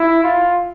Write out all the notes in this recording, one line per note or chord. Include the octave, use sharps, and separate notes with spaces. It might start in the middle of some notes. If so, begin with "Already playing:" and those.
Already playing: E4
F4